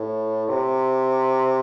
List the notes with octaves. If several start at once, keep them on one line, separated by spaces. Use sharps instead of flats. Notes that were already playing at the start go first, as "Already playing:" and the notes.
Already playing: A2
C3